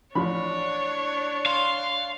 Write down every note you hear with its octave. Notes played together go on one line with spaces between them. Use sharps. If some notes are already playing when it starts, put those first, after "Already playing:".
A1 F3 D4 C#5 B5
F5 C6